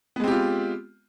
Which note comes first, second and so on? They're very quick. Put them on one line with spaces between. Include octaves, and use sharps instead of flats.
B3 G#3 C4 G4 F4